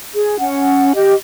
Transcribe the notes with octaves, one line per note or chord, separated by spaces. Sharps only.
G#4
C#4 F#5
G4 D#5